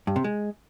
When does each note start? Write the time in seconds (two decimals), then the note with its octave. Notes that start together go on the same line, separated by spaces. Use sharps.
0.07 G2
0.16 C3
0.24 G#3